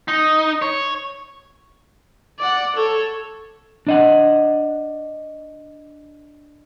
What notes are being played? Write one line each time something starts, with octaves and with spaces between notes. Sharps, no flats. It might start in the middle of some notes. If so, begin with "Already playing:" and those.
D#4
C#5
D5 F#5
A4 C#5
D4 D#5 F#5